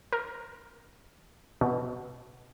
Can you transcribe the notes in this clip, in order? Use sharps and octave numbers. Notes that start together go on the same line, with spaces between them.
A#4
B2